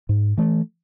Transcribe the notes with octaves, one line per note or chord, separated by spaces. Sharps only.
G#2
E3 A3